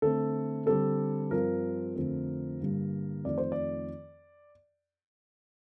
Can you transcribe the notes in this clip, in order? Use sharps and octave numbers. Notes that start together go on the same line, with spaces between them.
D3 A3 C4 A4
D3 G3 C4 A4
G2 F3 C4 A#4
F2 D3 A3 C4
G2 D3 G3 A#3
F2 D#3 A3 C4 D5
C5
D5